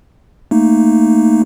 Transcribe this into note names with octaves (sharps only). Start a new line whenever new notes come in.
A3 A#3 D#4